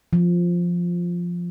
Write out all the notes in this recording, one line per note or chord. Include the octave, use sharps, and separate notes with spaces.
F3